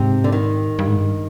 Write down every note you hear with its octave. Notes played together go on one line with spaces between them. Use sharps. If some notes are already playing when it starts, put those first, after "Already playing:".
Already playing: G#2 C3
D3
D#3
G2
G#2
G2